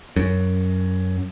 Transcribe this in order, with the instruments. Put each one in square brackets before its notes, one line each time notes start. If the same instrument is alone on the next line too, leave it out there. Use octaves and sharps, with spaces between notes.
[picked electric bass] F#2